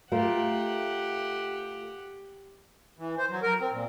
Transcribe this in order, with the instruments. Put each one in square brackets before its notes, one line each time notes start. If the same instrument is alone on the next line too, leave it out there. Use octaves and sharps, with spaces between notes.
[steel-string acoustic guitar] A3 F4 A#4 [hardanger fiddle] G4 F#5
[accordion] E3
C5
F#3
A#4
C4
A#2